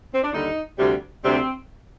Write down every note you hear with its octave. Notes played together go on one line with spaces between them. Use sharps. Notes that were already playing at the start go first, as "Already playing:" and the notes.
C4
D4
D#2 D3 G3 D#4
D2 C3 G3
D2 C3 G3 C4